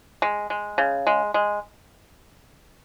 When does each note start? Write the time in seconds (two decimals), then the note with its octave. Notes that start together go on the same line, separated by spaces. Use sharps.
0.22 G#3
0.50 G#3
0.78 C#3
1.07 G#3
1.34 G#3